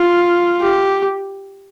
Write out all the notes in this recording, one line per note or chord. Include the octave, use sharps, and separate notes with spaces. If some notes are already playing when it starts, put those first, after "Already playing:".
Already playing: F4
G4